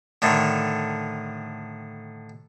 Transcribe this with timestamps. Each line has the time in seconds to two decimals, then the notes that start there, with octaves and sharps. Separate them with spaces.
0.22 A2 D3 D#3